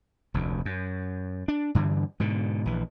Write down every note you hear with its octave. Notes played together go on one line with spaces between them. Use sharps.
F1 D2
F#2
D4
G2 D3 E3
G#2 B2 D3
A#1 E3